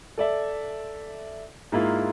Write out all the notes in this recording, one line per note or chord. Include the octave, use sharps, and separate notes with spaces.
A4 D5 E5
G#2 A#3 E4 F4